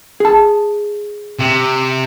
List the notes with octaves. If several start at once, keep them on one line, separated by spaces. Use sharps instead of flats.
G#4 A5
C3